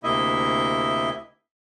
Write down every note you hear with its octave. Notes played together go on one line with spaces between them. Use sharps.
D2 C3 A#3 E4 D#5 E5